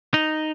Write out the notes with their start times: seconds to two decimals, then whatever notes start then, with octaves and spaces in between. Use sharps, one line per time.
0.14 D#4